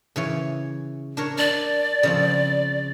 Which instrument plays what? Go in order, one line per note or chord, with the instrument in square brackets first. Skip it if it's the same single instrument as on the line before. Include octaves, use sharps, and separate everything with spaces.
[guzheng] C#3 E3 C#5
D4 A#4 C#5
[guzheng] D4 [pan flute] D5
[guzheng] C#3 F3 C4